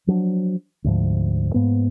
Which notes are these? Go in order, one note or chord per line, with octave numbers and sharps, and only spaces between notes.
F3 F#3 A#3 D4
D2 G#2 F3
G#2 A#3 B3